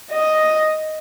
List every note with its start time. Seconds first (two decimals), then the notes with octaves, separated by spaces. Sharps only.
0.11 D#5